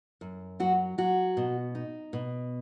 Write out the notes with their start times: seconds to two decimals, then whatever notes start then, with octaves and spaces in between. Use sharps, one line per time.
0.21 F#2
0.60 F#3 F#4
0.98 F#3 F#4
1.37 B2
1.75 D#4
2.13 B2